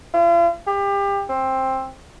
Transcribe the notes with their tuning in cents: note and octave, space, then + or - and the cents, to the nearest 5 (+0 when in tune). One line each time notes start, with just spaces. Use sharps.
F4 -40
G4 +30
C4 +15